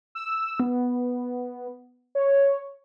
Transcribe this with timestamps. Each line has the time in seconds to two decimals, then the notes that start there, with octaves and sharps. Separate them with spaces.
0.15 E6
0.60 B3
2.15 C#5